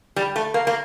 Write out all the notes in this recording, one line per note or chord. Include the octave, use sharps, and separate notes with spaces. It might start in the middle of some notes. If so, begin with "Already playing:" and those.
G3
A3
A#3
A#3